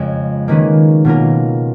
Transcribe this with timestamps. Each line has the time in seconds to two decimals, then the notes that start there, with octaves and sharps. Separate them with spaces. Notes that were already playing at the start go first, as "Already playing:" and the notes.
Already playing: F2 C#3 G#3
0.48 D#3 A#3 C#4 G#4 B4
1.05 B2 A#3 C#4 F4 A#4